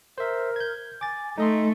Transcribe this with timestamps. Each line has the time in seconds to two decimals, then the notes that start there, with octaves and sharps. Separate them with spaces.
0.18 A#4 C5 E5
0.56 G6 G#6
1.01 G#5 D6 A6
1.38 A3 D#4 A4 D#5 C6